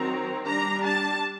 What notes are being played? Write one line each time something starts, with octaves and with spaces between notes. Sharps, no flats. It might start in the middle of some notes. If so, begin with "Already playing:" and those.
Already playing: D#3 F#3 C4 A#5
G3 D4 A#5
A5